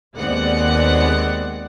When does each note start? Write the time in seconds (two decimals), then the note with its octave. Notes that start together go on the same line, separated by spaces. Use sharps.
0.15 D#2 G#3 B3 C4 D5 F#5